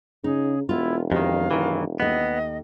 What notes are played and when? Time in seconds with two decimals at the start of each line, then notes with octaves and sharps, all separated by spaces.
0.24 C#3 D#4 G#4
0.69 E1 B3 E4 F4
1.12 F2 D#3 G4 F5
1.51 F#2 D#3 E3
2.00 D#2 A3 B3 D#5